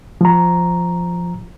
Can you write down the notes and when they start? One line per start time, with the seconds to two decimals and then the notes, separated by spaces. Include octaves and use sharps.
0.21 F3 A#5